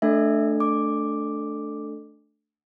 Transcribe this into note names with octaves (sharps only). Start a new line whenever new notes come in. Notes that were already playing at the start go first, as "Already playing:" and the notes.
A3 D4 A4 E5
D6